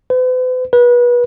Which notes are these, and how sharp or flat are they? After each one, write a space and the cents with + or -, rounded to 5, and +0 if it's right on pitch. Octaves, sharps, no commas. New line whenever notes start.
B4 +45
B4 -30